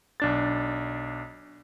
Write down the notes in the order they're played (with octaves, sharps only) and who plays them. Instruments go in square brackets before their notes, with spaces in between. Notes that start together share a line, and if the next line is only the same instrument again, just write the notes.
[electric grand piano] B1 D4 A6